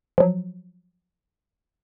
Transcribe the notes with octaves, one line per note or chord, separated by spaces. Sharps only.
F3 F#3